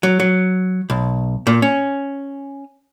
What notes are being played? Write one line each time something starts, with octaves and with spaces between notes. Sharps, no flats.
F#3
F#3
B1
A#2
C#4